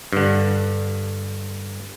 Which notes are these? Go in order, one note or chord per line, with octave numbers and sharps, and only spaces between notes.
G2 D3